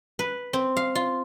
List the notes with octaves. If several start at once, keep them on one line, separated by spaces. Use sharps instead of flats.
B4
C4
F5
F4